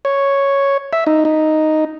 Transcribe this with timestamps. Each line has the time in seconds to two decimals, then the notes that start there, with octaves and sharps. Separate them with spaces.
0.05 C#5
0.93 E5
1.07 D#4
1.25 D#4